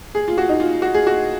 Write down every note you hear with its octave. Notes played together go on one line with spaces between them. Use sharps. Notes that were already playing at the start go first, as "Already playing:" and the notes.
G#4
F4
F#4
D#4
F4
F#4
G#4
F#4